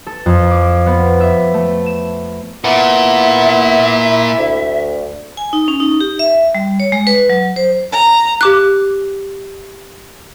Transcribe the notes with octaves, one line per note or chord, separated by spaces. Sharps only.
A4
F2
D6
B3
E5
A3
E7
A#2 B3 E4 E5
D2
G#5
D#4
C#4
D#4
G4
E5
G3
C#5
G#3
B4
F#3
C5
A#5
G4 D6 F#6